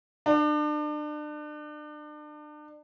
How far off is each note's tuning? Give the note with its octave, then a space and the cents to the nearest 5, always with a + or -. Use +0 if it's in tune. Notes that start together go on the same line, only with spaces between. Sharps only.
D4 +35